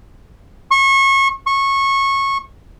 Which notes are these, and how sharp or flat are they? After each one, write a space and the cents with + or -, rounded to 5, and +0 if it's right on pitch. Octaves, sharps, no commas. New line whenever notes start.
C#6 -30
C#6 -20